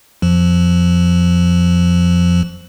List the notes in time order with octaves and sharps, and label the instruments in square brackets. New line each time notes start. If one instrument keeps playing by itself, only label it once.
[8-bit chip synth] F2 F3